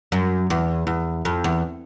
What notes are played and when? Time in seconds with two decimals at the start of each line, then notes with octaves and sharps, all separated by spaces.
0.12 F#2
0.50 E2
0.87 E2
1.25 F2
1.44 E2